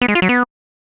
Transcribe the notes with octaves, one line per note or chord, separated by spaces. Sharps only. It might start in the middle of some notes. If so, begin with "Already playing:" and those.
B3
G#3
F4
F#3
B3